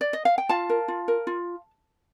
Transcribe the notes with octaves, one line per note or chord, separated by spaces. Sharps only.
D5
D#5
F5
G5
F4 F5 A5
A#4
F4
A#4
F4